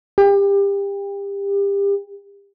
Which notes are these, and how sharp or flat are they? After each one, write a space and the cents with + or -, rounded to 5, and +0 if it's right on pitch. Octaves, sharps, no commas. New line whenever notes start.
G4 +30